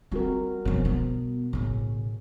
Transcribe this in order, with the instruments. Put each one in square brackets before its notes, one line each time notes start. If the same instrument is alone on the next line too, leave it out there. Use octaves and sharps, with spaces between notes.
[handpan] G3 F#4 A#4 [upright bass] C4
[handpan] B2 [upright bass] F3 C#4
[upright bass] B3
A1 C#3